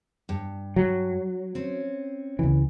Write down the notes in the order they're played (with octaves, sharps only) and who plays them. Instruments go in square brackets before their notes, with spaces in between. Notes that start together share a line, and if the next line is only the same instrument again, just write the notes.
[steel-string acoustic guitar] G2
[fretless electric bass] F#3
[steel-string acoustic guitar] C4 C#4
[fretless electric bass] C#2 E3